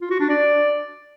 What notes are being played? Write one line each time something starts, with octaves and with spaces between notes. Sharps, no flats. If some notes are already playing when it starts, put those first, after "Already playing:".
F4
F#4
D4
D5